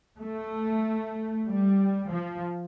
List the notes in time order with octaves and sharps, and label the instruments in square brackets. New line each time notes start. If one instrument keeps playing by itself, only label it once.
[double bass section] A3
G3
F3